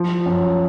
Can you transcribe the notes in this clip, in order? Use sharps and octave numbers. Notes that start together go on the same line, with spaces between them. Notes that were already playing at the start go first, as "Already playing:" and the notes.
Already playing: F3
F#2